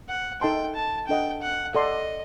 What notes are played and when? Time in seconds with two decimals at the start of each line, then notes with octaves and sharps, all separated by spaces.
0.09 F#5
0.41 D#4 A4 D#5 G5 A5 C6
0.75 A5
1.08 D4 A4 D#5 F#5 G5
1.42 F#5
1.75 A4 D5 D#5 F#5 C6